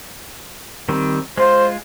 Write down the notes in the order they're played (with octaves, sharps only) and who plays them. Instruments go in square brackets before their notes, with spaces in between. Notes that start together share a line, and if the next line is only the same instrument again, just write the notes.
[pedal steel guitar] D#3 G3 C4
[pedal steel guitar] G#3 F4 [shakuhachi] C5